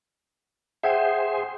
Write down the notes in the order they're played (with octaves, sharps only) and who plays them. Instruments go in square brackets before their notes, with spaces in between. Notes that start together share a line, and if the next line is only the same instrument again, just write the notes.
[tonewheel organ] G#4 C5 [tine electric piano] E5 F#5 G5